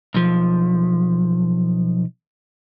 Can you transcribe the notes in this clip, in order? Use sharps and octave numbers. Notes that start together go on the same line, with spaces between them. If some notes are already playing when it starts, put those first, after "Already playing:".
B1 F3